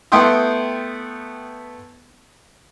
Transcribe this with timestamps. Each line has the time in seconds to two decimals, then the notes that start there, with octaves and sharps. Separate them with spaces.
0.12 A3 B3 E4 G5 C6 D#6